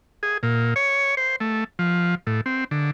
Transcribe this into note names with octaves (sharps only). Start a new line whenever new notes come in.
G#4
A#2
C#5
C5
A3
F3
A2
C4
D3